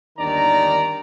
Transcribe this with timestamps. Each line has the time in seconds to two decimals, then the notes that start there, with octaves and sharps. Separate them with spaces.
0.19 G1 D#2 D#3 D4 D5 A#5